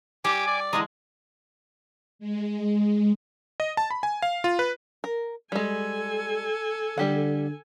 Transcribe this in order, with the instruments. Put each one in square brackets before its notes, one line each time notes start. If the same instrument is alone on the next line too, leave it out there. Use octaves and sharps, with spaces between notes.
[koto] G3 [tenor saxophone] G4 [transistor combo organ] G#5 D6
[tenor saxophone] D5
[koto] D3 E3 G#3 [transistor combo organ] A#5 D#6
[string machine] G#3
[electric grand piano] D#5
A5
B5
G#5
F5
F4
B4
[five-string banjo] A#4
[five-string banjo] G3 G#3 [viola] A4 G#5
[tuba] D3 [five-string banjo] G3 G4 F#5